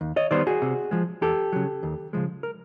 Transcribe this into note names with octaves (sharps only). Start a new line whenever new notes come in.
D#2
C#5 D#5
D#3 G3 B3 C5 D5
F#4 G#4
C3
F3 G#3
E2 G4 A4
C#3 F#3
D#2
C#3 F3 G#3
A#4